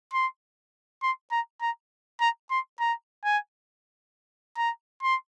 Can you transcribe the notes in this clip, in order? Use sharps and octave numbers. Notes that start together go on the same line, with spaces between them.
C6
C6
A#5
A#5
A#5
C6
A#5
G#5
A#5
C6